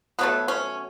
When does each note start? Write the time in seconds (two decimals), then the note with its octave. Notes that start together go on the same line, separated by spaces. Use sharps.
0.19 B2 F#3 A3 B3
0.48 C#4